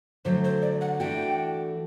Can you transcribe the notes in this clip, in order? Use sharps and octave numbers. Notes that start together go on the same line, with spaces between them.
D3 F#3 A3 C5
C5
D5
F#5
E3 A3 D4 F#4 G5